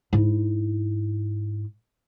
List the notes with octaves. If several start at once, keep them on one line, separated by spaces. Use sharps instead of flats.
G#2 E4